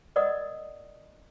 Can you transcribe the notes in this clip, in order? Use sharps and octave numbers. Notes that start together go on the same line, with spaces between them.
A#4 D5 D#5 F#5 D#6